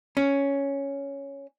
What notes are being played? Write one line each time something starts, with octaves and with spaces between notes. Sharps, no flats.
C#4